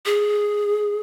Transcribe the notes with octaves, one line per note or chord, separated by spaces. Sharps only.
G#4